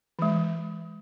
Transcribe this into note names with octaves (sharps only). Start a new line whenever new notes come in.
E3 G#3